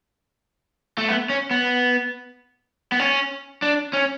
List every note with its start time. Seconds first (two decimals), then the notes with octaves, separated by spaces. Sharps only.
0.98 A3
1.09 B3
1.30 C#4
1.51 B3
2.92 B3
2.99 C#4
3.62 D4
3.93 C#4